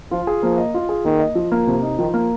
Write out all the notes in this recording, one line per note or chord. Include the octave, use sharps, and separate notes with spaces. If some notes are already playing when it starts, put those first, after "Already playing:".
F3 F4
G#4
F3 A#3
D#5
F4
G#4
D#3 A#3
D#5
F3
A#3
C3 F3
D#4
D#3 F3
A#3